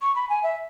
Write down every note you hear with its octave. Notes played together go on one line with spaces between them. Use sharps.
C#6
B5
G#5
E5